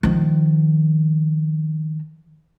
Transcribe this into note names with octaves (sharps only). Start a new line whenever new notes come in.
D#3 F3